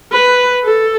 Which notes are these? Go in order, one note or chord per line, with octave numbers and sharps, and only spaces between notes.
B4
A4